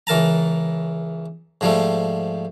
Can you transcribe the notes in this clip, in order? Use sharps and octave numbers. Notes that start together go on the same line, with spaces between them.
C#2 E3 A#4 A5 A#5
G#2 F3 G3 A3